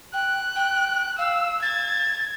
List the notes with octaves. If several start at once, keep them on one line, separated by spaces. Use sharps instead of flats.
G5 F#6
G5
F5 E6
G#6 A6